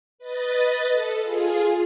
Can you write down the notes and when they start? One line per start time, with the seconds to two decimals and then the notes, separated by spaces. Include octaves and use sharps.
0.18 B4 D#5 A6
0.90 A4
1.21 F4 G#4